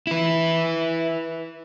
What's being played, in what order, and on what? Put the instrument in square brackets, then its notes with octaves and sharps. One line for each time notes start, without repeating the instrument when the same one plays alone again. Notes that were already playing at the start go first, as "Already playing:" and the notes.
[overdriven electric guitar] E4 B4